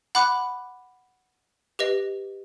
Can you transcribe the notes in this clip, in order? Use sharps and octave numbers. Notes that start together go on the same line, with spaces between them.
F#5 B5 D6 F#6
G4 B4 D#5